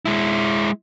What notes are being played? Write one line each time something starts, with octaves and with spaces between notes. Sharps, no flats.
G#3 E4